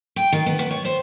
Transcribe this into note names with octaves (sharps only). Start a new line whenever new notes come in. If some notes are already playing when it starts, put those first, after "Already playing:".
G5
D#3
B3
B3
C#5
C5